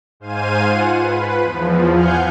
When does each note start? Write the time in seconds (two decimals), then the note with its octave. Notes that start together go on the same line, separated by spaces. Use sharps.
0.20 G#2 C5 F5 G#5 D#7
0.61 F4 F#5
0.97 B4
1.41 E2 F3
1.93 F5 F#5 G#5 F6 G6